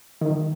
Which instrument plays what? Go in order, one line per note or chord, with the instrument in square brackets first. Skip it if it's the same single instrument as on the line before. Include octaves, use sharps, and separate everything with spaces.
[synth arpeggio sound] D#3